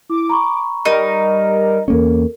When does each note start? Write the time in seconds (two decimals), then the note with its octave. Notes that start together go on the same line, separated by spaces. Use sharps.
0.10 E4 D6
0.29 A#5 B5 C#6
0.85 G3 D#4 A#4
1.88 E2 A#3 C#4 A4 A#4